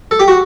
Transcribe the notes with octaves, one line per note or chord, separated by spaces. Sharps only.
A4
G4
F#4